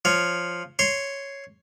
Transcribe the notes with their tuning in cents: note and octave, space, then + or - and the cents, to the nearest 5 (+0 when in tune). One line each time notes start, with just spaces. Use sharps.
F3 +0 C#5 +10
C#5 +0 C6 +0